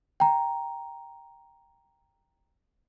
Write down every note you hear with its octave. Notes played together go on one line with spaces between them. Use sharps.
G5 A#5